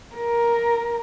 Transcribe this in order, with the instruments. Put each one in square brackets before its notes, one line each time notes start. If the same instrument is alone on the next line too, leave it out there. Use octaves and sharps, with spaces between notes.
[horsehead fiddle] A#4